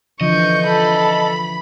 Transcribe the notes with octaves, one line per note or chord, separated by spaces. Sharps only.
D3 E3 F3 D#5 C#6 G6
A4 B5